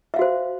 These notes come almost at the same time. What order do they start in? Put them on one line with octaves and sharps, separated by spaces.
E5 F5 F#4 C5